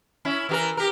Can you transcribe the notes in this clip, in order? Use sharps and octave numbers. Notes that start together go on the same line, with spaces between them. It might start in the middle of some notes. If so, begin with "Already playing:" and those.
C#4 E4
E3 G4 A#4
G4 A#4